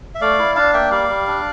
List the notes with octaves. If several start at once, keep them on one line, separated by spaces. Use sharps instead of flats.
E5
A3 D5 F5
E4
D4 F5 A5
A#3 E5 G5
G3 D5 F5
G3
D4